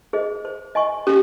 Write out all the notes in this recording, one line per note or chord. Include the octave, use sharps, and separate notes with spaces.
G#4 C5 D#5
C5
D#5 G#5 C#6
C#4 G4